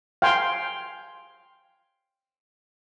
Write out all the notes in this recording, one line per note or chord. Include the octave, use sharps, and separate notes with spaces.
F5 G5 G#5 C6